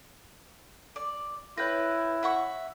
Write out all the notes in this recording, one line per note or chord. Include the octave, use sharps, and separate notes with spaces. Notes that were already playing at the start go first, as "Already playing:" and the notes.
D5
E4 B4 C#5 G5 F#6 A#6
E5 F#5 C#6